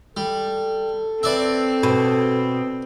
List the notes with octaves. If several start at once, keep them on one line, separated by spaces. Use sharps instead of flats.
G3 A4
C4 B4 D5 E5
B2